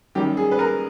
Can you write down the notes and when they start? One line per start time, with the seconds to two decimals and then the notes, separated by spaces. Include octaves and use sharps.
0.15 F#2 D#3 G3 G4
0.37 G#4
0.51 B4
0.59 A#4